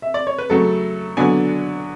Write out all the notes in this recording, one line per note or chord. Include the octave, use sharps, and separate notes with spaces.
E5
D5
C#5
B4
C#3 F#3 A3 A4
D3 F#3 B3 D4 G#5